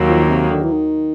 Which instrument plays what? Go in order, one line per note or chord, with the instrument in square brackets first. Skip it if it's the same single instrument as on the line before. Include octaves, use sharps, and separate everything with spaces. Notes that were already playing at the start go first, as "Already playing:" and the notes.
Already playing: [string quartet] D#2 D#3 F#3 A#3
[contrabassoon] F3
C3
D3
E3
D#3